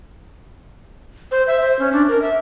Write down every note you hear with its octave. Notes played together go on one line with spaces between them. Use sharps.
C5
E5
C5
C#4
D4
A#4
E5